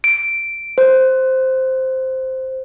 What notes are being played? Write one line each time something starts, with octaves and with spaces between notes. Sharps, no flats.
D7
C5